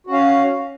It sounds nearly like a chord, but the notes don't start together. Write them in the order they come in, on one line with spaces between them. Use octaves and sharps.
F#4 C#4 F5